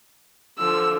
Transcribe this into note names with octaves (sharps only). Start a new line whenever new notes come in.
D3 F3 E6